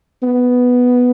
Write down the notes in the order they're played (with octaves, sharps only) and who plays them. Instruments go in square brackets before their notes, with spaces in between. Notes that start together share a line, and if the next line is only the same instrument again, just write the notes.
[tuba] B3